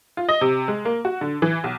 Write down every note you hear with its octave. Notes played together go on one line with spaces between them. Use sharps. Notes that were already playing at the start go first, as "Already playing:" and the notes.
F4
D#5
C3
G#3
A#3
F#4
D3
E3
B1